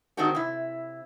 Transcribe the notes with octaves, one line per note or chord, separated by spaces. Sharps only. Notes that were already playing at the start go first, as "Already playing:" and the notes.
D#3 G#3 C4 D4 F#4 G4
C3 E4